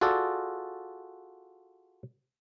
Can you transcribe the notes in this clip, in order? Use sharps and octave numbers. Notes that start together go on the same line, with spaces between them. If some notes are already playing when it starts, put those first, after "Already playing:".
F4 F#4 G#4 A4 D5